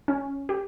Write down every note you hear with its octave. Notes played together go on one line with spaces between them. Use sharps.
C#4
G4